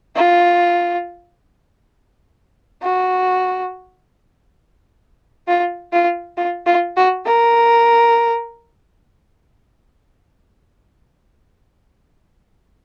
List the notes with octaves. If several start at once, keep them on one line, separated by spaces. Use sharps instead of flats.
F4
F#4
F4
F4
F4
F4
F#4
A#4